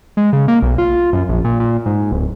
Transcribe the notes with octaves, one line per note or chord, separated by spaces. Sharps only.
G#3
C#3
A#3
B1
F4
F#2
A#1
A#2
A#2
G#2
D1